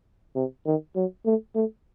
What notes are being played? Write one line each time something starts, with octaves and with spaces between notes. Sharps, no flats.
C3
D#3
F#3
A3
A3